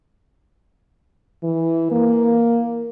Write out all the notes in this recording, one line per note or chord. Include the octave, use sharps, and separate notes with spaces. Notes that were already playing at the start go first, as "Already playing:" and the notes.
E3
A#3